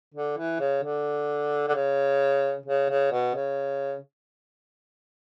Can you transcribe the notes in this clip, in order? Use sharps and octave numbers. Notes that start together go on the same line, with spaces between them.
D3
E3
C#3
D3
D3
C#3
C#3
C#3
B2
C#3